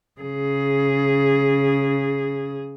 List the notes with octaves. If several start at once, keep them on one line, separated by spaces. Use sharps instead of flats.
C#3 G#4